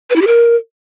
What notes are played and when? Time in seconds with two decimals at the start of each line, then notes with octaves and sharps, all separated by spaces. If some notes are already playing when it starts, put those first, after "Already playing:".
0.10 B4
0.16 E4
0.22 G4
0.27 A#4